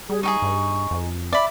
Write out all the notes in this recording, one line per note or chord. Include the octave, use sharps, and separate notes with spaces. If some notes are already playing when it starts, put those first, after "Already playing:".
G3 G#4
D#4 G4 G#4 C#6
G2
F2
D5 E5 B5